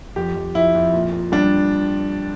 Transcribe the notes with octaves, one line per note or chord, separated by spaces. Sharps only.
F2 G4
F2
F2 E4
F2
A#2
A#2
G3 D4